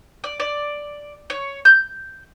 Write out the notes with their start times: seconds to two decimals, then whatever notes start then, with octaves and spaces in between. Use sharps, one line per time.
0.24 D5
0.40 D5
1.30 C#5
1.65 G6